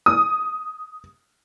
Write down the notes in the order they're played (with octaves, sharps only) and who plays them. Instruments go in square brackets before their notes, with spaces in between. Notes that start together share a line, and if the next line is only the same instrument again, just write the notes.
[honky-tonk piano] D#6